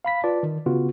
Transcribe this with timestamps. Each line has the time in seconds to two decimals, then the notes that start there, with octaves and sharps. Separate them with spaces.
0.05 F5 B5 B6
0.24 F4 B4 D5 A5
0.43 D#3
0.66 C#3 B3 F4 F#4